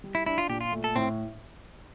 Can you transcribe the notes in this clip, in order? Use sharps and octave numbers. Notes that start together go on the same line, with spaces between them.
G3
E4
D4 E4
F4
A#2 G4
F4
A3
A4
A2 C4